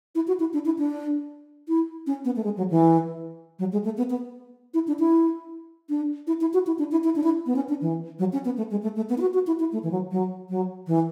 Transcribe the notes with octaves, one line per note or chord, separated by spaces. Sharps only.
E4
F#4
E4
D4
E4
D4
E4
C#4
B3
A3
G#3
F#3
E3
F#3
G#3
A3
B3
B3
E4
D4
E4
D4
E4
E4
F#4
E4
D4
E4
E4
D4
E4
B3
C#4
D4
E3
F#3
C#4
B3
A3
G#3
A3
A3
B3
E4
F#4
F#4
E4
E4
A3
E3
F#3
F#3
F#3
E3